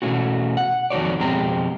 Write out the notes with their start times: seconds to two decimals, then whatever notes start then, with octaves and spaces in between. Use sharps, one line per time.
0.02 B2 E3 G3 A3 C#4 F#4
0.57 F#5
0.90 F2 D#3 F#4 C#5 D5
1.19 F2 B2 G#3 C4 G4 A#5